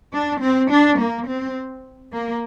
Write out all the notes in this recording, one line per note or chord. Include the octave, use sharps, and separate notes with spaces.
D4
C4
D4
A#3
C4
A#3